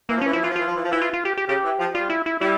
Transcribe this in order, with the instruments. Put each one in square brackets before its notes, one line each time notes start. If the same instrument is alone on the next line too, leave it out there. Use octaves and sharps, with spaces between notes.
[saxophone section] E3 [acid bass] A#3
[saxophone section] F3
[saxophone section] E3 [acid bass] C#4
[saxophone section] F3 [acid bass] E4
[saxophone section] E3 [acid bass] F4
[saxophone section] F3
[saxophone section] E3 [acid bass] F4
[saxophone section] F3
E3
F3
[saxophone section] E3 [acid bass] E4
[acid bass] F4
F4
G4
G4
[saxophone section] C#3 [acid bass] G4
[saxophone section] E3
F3
[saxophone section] G3 [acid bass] F4
[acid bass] E4
E4
[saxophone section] G3 [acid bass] E4